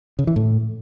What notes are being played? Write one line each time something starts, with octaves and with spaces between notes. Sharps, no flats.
C#3
E3
A2